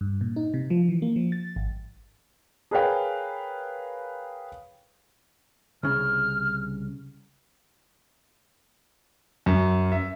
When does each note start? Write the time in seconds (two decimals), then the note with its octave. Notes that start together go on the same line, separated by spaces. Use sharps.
0.01 G2
0.21 A#2
0.36 D#4
0.54 C3
0.70 F3
0.89 E3
1.02 A#3
1.16 F3
1.32 A6
1.56 G#1
2.71 G#4 A#4 B4 C#5 F5 G5
5.83 C2 C#3 F6
9.46 F#2
9.92 E5